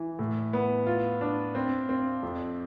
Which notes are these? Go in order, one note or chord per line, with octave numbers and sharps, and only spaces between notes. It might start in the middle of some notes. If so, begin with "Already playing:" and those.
Already playing: E3
A2
B3
F4
D4
C4
C4
F2